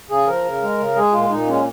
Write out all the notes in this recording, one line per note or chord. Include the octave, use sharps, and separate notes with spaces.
C#3 G#4
F3 A#4
C#3
G#3
C#3
G#3 G#4
A#2 F4
A#2 D#4
G#3 C#4